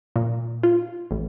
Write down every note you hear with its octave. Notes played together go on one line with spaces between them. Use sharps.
A#2
F4
A1